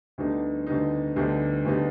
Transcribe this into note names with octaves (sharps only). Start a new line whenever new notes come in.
D2 D3 G3 B3 D#4
D2 D3 G3 B3 D#4
D2 D3 G3 B3 D#4
D2 D3 G3 B3 D#4